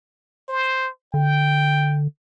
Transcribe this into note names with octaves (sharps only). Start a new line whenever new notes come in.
C5
D3 G5